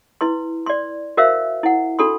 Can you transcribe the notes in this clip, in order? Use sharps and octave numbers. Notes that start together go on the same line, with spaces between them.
E4 B4 C6
D5 C6
F#4 A#4 C5 E5 F5
E4 F#5
D4 F#4 A4 B5 C6